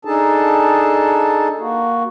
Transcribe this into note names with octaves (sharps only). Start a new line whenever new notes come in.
D4 D#4 G#4 A4 A5
A#3 F#4